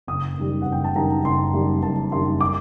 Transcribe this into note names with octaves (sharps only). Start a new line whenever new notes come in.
F#1 D#6
F#2 D#3 G3
F#1 F#5
G5
A5
F#2 D#3 G3 A#5
F#1 C6
F#2 D#3 G3
F#1 A5
F#2 D#3 G3 C6
D6